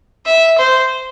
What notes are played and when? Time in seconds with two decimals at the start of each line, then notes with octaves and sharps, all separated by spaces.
0.26 E5
0.58 C5